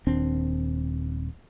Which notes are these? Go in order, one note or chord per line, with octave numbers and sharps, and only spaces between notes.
D#1 D#2 C4 D4